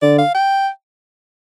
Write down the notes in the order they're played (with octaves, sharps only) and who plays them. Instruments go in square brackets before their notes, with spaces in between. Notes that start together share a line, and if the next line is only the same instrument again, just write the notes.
[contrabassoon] D3 [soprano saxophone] D5
[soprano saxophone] F5
G5